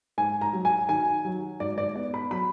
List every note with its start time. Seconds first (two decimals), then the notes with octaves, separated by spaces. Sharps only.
0.18 G#2 G#5
0.41 A#5
0.53 F#3
0.65 G#5
0.89 D#3 G#5
1.25 F#3
1.60 G#2 D5
1.78 D5
1.96 B3 D5
2.14 B5
2.31 F#3 B5